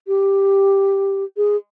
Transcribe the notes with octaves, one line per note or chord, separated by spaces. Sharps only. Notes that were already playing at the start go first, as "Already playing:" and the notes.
G4
G#4